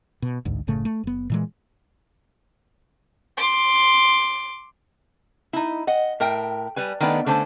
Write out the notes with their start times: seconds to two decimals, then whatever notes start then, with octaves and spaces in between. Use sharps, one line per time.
0.22 B2
0.45 A1 D2 G#2
0.67 F#1 A2 C#3 A3
0.85 A3
1.04 F#1 B3
1.30 A#2 E3 G#3
3.37 C6 D6
5.53 D#4 E4
5.87 D#5 F#5
6.20 A2 A#4 E5 G5
6.76 G3 B4 G#5
7.00 D#3 A3 B3 D4 B4
7.26 D3 A3 C#4 C5 A5